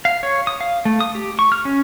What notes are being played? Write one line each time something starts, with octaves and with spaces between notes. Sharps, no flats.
F5
C#5
D#6
F5
A3
D#6
G4
C#6
F6
C#4